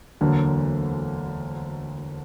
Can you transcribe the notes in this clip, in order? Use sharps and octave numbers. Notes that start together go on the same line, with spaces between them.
E1 D2 D3 F#3 A#3